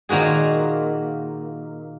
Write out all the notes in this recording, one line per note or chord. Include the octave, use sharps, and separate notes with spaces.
A#2 D#3 A#3 F#4 G#4